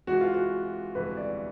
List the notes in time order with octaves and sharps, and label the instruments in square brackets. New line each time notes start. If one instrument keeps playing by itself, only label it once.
[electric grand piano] C3 E3 G#3 [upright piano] F#4
[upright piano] F4
F#4
[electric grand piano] G1 F2 C3 E3 G#3 [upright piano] B4
[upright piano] D5